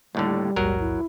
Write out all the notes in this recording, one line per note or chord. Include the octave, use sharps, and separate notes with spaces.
D#2 A2 D3 G3
A#1 D#2 G#2 F#3 A#4
E4